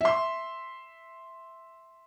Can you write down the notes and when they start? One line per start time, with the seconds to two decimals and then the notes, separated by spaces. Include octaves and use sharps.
0.01 E5 C6